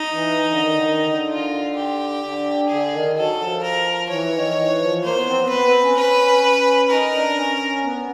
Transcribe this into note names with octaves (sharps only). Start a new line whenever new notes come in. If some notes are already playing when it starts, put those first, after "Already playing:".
Already playing: D#4
E3
D3
D#3
D3
D#3
D3
F4
G4
D3
D3 G#4
D#3
F#3 A4
F3
A#4
E3 C#5
D#3
E3
F3
A#3 C5
B3
C4
B3
B3 B4
C4
C#4
B4
D#4 A#4
D4
C#4
B3